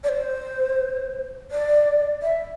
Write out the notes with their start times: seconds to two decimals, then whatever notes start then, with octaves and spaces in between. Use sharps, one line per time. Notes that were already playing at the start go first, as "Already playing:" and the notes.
0.04 D5
0.09 C5
1.51 D5
2.23 E5